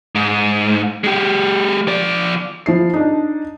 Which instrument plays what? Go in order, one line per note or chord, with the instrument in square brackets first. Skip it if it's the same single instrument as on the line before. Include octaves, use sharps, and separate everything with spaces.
[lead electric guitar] G#2
G#3 G4
F3 D5
[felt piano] F3 E4 C7
D4 D#4